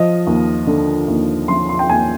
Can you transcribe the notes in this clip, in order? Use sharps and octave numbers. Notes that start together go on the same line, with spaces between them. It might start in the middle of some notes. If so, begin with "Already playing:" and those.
Already playing: F3 D#5
D#2
D3
D#2
F3 C6
C6
G5
D#2 G#5